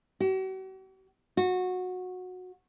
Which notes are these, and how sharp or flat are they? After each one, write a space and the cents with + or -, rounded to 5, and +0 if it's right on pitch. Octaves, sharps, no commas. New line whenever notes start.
F#4 +45
F#4 -20